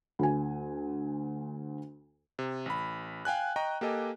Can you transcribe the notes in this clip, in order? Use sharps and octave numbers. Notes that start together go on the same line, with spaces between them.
D2 G#5
C3
A1 B5
F5 G5 G#5 F#6
D#5 G5 A#5 C#6
A#3 G4 A4 D#5 G#5